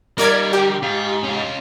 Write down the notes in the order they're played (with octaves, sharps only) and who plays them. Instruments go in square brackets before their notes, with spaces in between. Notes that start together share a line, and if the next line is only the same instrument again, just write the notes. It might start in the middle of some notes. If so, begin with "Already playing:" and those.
[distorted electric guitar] G3 [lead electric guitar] D#4 F4 [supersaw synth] A#4 D5 G#6
[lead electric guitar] D3 A#4 [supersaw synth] G4
[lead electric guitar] G#2 [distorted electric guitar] F4
[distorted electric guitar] C#4 F4